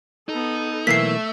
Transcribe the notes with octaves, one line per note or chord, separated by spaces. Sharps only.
B3 D#4 A4
B1 E3 A3 A#3 E5 B6 C7